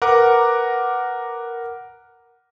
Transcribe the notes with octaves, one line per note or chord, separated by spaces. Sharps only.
A#4 B4 F#5 A#5 D6